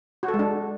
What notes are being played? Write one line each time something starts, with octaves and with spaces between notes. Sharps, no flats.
F#4
A4
G#3
D4